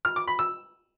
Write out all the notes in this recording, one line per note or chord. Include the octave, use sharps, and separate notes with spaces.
F6
D6
B5
E6